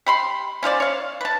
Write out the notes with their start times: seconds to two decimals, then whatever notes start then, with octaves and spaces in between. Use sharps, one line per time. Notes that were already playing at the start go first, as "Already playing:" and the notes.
0.06 G4 B5 C6
0.63 C#4 F4 C5 D5
0.80 C#5 F5
1.21 B4 A5